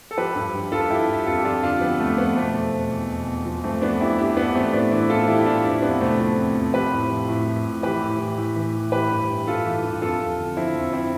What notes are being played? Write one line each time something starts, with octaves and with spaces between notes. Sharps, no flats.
A4
F3 G4 B4
G2
F3
G2 F4 A4
F3 E4 G4
G2
F2 F4 A4
G4
F2 D4 F4
D3 D4 F4
F3 B3
F2 A3
F2 B3
B2 A3 C4
E2
B2
E2
B2
E2
F3
G2 A3 C4
F3 B3 D4
G2 E4 G4
F3 E4 G4
G2 B3 D4
E3 A3 C4
A2 B3 D4
E3 C4 E4
A2 F4 A4
E3 E4 G4
G4
A2 D4 F4
F2 C4 E4
F2 B3 D4
C3 A3 C4
F3
F2
F2
F3 G4 B4
A2
F3
A2
F3
A2
E3 G4 B4
A2
E3
A2
E3
A2
E3 G4 B4
G2
E3
G2 F4 A4
E3
G2
F2 F4 A4
F2
D3
F3 C4 E4
F2
C4 E4